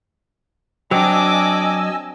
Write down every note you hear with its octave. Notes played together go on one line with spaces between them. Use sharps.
F#3 C4 D4 D#5 G#5 D6 E6